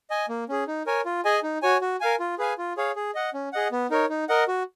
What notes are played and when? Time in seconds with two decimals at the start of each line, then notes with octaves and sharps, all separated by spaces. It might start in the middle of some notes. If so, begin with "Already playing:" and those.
0.10 D#5 G#5
0.29 A#3
0.49 C#4 G#4
0.67 D#4
0.86 A#4 C#5 G#5
1.06 F4
1.25 G#4 D#5 G#5
1.43 D#4
1.62 F#4 C#5 G#5
1.81 F#4
2.00 A#4 F5 G#5
2.20 F4
2.38 G#4 B4 F5 G#5
2.58 F4
2.77 G#4 C#5 F5
2.96 G#4
3.15 D#5 F#5
3.34 C#4
3.53 G#4 D#5 F#5
3.72 B3
3.90 D#4 A#4 C#5
4.09 D#4
4.29 A#4 D#5 F#5
4.48 F#4